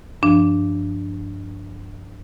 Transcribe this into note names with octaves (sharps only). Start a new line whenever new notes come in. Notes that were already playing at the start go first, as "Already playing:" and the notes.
G2 F3 D4